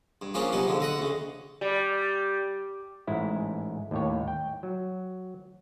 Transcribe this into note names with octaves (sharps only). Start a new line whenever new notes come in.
G2
F3 A#3 C#4 D4 G#4
C3 F#3 B3 D#4
G#2 D3 F3
D3 D#5 F#5
D2 C#3
G3
A1 G#2 G#3 E4
D#2 A2 C#5
G5
F#3